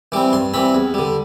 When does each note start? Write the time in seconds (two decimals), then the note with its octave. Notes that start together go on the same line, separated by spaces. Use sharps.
0.12 E3 G3 C4 D6
0.33 G2 C6
0.54 E3 G3 C4 B5
0.75 E2
0.94 D3 G3